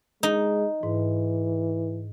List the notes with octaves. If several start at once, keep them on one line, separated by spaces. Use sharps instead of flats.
G#3 D#4
G#2 E3